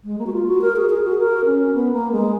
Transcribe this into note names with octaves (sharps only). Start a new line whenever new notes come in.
G#3
A#3
F#4
F4
F#4
A#4
G#4
G#4
F#4
A#4
C#4
B3
A#3
G#3